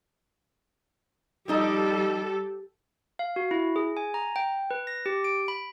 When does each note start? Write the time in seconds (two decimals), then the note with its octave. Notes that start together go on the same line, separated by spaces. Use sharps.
1.48 F3 G3 D#4 G4 A4 D#5
3.19 F5
3.36 F#4
3.51 E4
3.76 G#4
3.97 G#5
4.14 A#5
4.36 G5
4.71 B4
4.87 A#6
5.06 G4
5.24 D7
5.48 B5